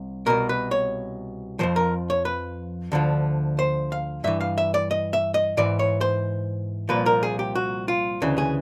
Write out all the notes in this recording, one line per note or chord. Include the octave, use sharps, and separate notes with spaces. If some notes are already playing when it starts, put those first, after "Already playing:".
Already playing: C2
C2 B2 A#4
B4
C#5
F2 C#3 F3 C5
A#4
C#5
B4
D2 D3 F3
C5
F5
G2 E3 E5
F5
E5
D5
D#5
E5
D#5
G#2 E3 D5
C#5
C5
C2 A#2 F3 B4
A#4
G#4
G4
F#4
F4
D2 C#3 E3
G#4